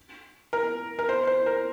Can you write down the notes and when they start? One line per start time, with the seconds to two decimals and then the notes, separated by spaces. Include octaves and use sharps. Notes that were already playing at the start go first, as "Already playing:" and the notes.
0.53 A#4
0.99 A#4
1.09 C5
1.27 C5
1.46 A#4